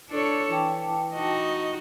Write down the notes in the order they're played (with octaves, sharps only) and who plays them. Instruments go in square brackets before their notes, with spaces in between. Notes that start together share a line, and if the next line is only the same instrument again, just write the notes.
[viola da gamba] D4 A4 C#5
[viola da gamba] E3 [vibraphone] G5 A5 D6
[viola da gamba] D#4 F#4 D#5